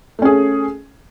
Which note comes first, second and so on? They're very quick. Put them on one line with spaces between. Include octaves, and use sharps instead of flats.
A3 C#4 G#4